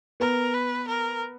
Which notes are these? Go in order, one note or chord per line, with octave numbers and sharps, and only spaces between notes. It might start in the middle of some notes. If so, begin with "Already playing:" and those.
B3 A#4
B4
A#4